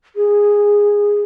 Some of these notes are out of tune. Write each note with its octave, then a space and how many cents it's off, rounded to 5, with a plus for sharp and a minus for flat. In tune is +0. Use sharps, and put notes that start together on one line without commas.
G#4 -10